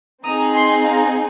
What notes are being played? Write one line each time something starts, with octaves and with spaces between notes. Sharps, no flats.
C4 D#4 G#4 A#5 D#6
G#5 C6
F5 A#5